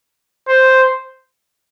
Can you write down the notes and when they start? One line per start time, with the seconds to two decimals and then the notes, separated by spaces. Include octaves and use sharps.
0.48 C5